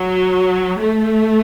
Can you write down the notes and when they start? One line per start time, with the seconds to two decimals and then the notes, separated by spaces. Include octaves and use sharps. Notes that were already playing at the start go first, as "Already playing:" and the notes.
Already playing: F#3
0.79 A3